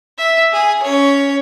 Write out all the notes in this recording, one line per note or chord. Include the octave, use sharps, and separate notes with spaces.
E5
G#4
C#4 C#5